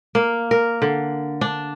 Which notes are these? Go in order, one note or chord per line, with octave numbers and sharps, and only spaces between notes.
A#3
A#4
D3
D4